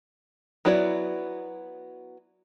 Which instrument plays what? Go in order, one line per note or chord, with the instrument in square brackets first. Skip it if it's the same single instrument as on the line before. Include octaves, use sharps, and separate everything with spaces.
[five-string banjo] F#3 B3 E4 F#4 D5